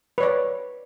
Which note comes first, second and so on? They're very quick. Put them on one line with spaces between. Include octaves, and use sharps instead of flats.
B4 C#5 D5